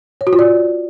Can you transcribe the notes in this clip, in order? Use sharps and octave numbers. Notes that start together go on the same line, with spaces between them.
C#5
F#4
F4
D5